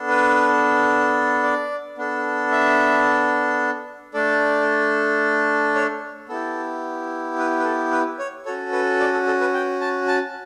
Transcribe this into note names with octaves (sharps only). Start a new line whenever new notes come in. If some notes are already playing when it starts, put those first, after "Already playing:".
Already playing: B3 D4 A4
B4
D5
B3 D4 A4
E5
A3 D4 A4 D5
C#5
B3 E4 G4 A4
B4
B4
A4
B4
C#5
C#4 F#4 A4 C#5
B4
D5
A4
A4
B4
G5
A5
A5